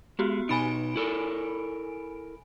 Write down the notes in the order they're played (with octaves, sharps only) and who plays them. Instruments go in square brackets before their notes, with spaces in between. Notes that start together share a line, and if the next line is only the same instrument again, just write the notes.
[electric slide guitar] G#3 [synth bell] B3 F#4 G4
[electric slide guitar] B2 D#4 [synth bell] G#5 B5 D7
[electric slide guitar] E4 A4 A#4